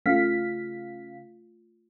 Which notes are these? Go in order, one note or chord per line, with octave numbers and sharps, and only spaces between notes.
C#3 A3 F4 F5 B6